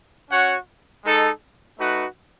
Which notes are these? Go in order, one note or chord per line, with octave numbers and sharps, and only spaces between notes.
C#4 F#4 C#5 F#5
G#3 D#4 A4
A3 D#4 F#4 B4